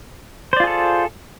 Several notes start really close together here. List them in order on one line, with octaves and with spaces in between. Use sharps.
C5 D5 F4 G#4 A4